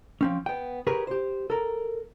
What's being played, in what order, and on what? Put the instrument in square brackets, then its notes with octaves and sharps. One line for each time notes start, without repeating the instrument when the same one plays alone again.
[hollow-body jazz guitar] F3 C4 C#4
B3 G5
G4 G#4 A#4 B4 C#5
G4 C5
A4 A#4